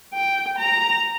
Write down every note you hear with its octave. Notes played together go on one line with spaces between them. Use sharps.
G5
A#5